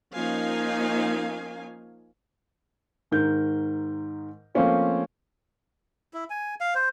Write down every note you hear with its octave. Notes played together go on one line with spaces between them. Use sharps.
F3 A#3 C#4 D#4 F5 G#5
G#2 D#3 A#4 G6
F3 A3 A#3 C4 C#4 F4
E4
G#5
F5
C5